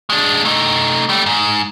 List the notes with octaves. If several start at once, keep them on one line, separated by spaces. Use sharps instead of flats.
G#3 D4
A3 D#4
G3 A3
G#2